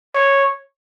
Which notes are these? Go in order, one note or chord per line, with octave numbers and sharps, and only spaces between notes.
C#5